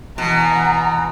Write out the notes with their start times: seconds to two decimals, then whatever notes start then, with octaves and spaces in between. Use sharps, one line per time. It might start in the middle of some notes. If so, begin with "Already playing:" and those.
0.18 B2 E3 F#5 G#5 A#5